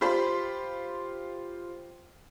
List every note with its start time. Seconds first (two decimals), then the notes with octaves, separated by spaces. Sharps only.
0.01 F4 G4 C5 B5 C6